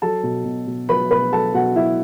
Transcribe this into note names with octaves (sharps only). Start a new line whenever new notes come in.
F#3 A4 A5
B2
B2
B2
F#3 B4 B5
B2 B4 B5
F#3 A4 A5
B2 F#4 F#5
F#3 E4 E5